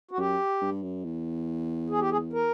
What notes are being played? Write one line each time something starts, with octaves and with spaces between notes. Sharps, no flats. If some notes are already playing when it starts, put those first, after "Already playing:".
F#4
F#2 G4
G2
F#2
E2
G#4
G4
G#4
A#4